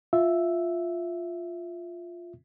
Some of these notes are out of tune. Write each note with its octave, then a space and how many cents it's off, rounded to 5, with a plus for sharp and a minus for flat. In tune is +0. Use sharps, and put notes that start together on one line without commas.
F4 +0 E5 +0